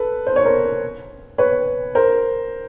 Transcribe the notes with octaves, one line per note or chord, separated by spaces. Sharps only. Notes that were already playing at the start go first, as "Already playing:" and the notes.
Already playing: A4 B4
C5
C#5
A#4 C5
B4 C#5
A#4 C5